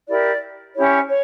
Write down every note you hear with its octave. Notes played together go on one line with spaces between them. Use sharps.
E4 G4 A#4 D5
C#4 E4 G4 C#5
C#5